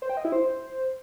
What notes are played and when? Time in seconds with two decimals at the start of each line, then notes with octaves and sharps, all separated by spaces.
0.02 C5
0.10 G5
0.17 D#5
0.25 E4
0.32 C5